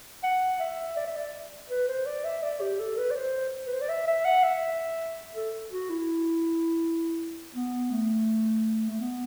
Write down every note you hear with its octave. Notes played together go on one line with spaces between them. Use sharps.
F#5
E5
D5
E5
D5
B4
C5
D5
E5
D5
G4
A4
B4
D5
C5
B4
C5
D5
E5
E5
F#5
E5
A4
F#4
E4
B3
A3
A3
B3